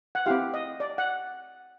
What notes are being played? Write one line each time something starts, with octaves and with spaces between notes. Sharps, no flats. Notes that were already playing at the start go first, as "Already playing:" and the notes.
F#5
C4 E4 G4 F5
D#5
D5
F#5